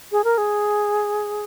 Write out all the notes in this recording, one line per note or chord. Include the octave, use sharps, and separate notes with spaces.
G#4
A#4
G#4